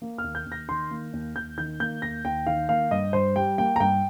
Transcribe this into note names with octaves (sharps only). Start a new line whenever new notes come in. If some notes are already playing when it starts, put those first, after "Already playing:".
A#3
F6
D#2
G6
D#2
A#6
D#3 C6
A#3
D#2
D#2 G6
D#3 G6
A#3 G6
D#2 A#6
D#2 G5
D#3 F5
A#3 F5
G2 D#5
G2 C5
G3 G5
A#3 G5
A#5
G2 G5